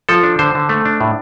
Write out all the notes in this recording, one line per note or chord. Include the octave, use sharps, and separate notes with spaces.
F3 A4
D4
D3 C5
D3
A3
D4
A2